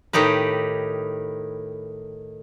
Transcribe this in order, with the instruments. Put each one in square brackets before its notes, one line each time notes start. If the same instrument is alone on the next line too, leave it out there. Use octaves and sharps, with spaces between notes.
[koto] A2 D#3 D#4 G4 B4